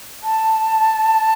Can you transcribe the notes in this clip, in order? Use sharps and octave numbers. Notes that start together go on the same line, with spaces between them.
A5